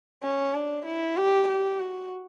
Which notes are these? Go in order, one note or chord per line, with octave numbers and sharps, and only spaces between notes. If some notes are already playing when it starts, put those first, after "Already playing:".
C#4
D4
E4
G4
G4
F#4